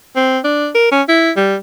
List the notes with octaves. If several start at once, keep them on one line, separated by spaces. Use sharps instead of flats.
C4
D4
A#4
C#4
E4
G3